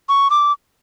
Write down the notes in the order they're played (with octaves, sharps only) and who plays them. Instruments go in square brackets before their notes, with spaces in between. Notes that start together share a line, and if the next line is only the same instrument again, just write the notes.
[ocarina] C#6
D6